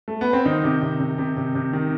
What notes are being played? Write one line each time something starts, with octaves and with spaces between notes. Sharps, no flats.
A3
B3
C4
D#3 D#4
C3
C3
C3
C3
C3
C3
D#3